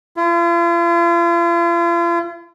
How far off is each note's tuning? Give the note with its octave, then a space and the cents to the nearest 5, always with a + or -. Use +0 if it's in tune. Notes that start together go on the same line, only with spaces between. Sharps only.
F4 -45